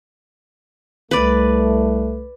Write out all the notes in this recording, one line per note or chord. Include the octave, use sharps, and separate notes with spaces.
C2 A3 B4 D5